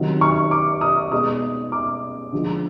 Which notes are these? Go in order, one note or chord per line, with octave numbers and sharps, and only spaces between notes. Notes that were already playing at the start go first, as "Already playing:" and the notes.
Already playing: C3 D#3 F#3
C#6
D6
D#6
B2 G#3 D#6
D6
D3 F3 G#3